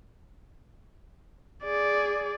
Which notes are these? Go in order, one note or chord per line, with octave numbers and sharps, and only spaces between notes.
G#4 D5